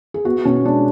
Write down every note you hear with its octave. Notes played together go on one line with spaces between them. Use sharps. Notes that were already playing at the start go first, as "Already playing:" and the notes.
G#4
B3 F#4
B2 C#4
G#3 D4